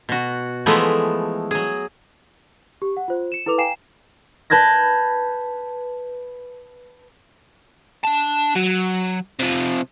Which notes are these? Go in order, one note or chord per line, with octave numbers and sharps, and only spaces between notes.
B2 F#4
E3 F3 G#3 A3 B3
F#3 G#4
G4
F#5
F4 C5
C#7 E7
E4 A4 B4 D6 F7
F5 G5 G#5 A#5 C7 E7
B4 A5 G6 G#6 A#6
D4 A5
F#3
C3 F3